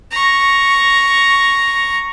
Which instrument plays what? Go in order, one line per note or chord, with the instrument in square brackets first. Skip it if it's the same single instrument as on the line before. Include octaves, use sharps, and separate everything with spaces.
[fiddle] A#5 C#6